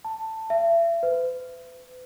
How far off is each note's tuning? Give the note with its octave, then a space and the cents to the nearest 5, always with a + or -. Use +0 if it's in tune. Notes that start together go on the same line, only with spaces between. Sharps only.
A5 +10
E5 +35
B4 +40